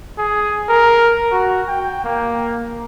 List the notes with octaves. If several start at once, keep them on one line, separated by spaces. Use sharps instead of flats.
G#4
A#4
F#4
G5
A#3